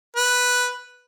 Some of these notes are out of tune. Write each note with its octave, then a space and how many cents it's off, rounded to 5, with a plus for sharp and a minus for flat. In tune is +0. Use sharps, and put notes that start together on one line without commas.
B4 +0